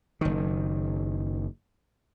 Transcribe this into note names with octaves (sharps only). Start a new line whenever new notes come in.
F#1 D#3